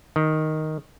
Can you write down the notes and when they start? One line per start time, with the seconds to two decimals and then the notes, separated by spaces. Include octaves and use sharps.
0.16 D#3